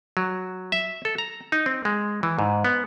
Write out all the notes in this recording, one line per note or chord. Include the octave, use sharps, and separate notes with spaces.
F#3
E5
A4
A#5
D#4
C4
G#3
E3
G#2
B3